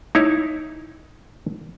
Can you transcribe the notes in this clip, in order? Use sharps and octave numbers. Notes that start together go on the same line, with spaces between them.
D#4 E4 C#5